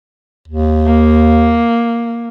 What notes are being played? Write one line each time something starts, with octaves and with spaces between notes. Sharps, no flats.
D#2
A#3